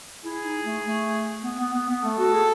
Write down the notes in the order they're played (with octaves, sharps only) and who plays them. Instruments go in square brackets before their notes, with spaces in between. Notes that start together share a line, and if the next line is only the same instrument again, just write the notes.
[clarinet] E4 [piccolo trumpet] G#4
[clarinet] D#4
A3
A3
B3
B3
B3
B3
[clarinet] A3 [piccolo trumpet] A4
[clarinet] F#4
G#4